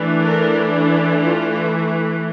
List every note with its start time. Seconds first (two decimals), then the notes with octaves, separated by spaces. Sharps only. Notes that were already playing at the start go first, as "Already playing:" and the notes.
Already playing: E3 A3 D4
0.23 A#4
1.26 F4